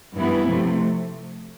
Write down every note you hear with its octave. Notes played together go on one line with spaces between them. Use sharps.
G2 E3 B3 E4
C3 F3 A3